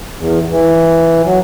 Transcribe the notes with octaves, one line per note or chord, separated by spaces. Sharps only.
E2
E3
F#3